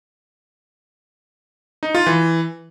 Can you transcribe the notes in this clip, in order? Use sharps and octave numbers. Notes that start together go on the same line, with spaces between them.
D#4
F4
E3